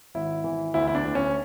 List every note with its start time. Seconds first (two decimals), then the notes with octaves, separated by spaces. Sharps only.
0.15 G#1 E4
0.44 E3
0.74 D2 E4
0.88 E4
0.95 D4
1.04 D2
1.15 C#4